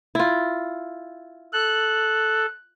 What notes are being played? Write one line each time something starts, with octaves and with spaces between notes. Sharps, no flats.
E4 F4
A4 F#6